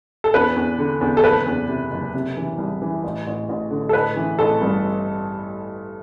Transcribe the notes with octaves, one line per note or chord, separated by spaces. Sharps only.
A4
E2 B4
E2
D3
E2
A4
F#1 B4
E2
C3
F#1
C3
E3
C2
E3
A1
A1
A1
D3
A4
A1 B4
E3
A1 A4
G2